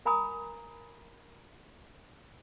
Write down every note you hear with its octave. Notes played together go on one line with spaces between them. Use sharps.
A#4 G#5 A#5 B5 D#6